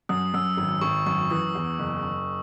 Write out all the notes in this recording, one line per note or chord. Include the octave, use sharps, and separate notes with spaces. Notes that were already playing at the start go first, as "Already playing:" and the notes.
F#2 D#6
F#2 E6
G#1 E6
G#1 C#6
F#2 C#6
E3 D#6
E2
F#1
F#1